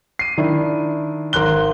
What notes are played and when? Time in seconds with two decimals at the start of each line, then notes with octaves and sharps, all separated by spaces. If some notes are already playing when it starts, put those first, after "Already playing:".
0.19 C7 D#7
0.38 D#3 D4 E4
1.33 G#1 A#4 C6 F#6 G7